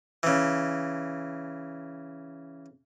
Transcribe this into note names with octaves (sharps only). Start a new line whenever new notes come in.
C#3 E3